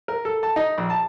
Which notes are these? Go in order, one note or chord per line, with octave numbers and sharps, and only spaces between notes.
A#4
A4
A5
D#4
A#1
A5